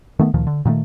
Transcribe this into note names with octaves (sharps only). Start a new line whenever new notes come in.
D#3 A3 B3
D2 A#2 D#3 F3
D3
A#2 D#3 F3 A3